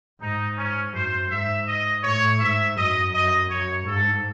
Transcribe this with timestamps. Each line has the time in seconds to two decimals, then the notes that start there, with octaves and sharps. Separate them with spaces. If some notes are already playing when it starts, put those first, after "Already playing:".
0.21 G#2 D#4
0.57 C#4
0.93 F#2 C5
1.30 G#2 E5
1.67 D#5
2.03 A2 C#5
2.40 G#2 E5
2.77 F#2 D#5
3.12 F#2 D#5
3.50 F#2 C#5
3.86 G#2 A4